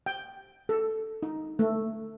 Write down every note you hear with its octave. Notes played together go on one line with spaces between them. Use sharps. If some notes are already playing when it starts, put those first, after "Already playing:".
G5
A4
D#4
A3